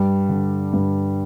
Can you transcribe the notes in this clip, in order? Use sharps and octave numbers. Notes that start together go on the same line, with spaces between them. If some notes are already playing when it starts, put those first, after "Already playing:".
Already playing: G2 G3
D3
G2